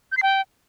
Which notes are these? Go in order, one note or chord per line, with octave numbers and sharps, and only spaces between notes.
G6
C7
G5